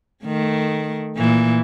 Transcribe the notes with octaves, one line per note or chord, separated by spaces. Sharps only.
D#3 A3
A#2 E3